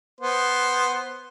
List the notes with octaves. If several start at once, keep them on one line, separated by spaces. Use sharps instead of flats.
B3 C5